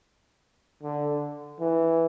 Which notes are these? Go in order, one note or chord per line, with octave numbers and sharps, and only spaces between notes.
D3
E3